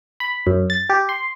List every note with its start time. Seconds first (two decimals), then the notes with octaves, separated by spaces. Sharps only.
0.20 B5
0.47 F#2
0.70 A6
0.90 G4
1.09 C6